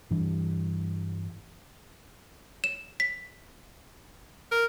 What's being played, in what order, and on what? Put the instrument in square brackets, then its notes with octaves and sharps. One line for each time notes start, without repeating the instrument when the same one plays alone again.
[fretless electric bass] G2 E3 G3 D4
[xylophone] E7
B6
[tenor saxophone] A#4